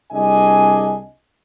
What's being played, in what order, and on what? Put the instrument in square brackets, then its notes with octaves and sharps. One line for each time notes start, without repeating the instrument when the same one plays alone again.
[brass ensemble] C2 D4 G#4 D#5 G#5